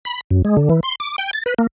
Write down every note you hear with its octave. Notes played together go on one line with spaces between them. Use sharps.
B5
F#2
G#3
D3
E3
C6
D6
G5
A6
B4
A#3